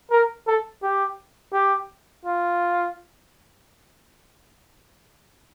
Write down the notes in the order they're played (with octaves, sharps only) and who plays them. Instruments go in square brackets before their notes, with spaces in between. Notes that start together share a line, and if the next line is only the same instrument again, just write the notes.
[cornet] A#4
A4
G4
G4
F4